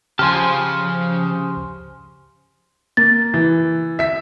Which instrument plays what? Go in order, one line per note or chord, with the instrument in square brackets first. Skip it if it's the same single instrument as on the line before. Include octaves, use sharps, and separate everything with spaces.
[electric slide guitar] C#3 [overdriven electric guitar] F3 A5 [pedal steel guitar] G4 C5 G#5 [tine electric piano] C6 F6
[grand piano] A#3 [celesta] A6
[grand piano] E3
E5 B6